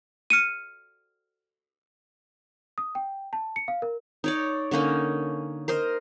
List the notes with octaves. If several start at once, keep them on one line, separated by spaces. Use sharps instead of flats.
F6 C#7 D#7
D#6
G5
A5
C#7
F5
A#4
D#4 C#5 D5
D3 A#3 C#4 D#4
A#4 C5 D#5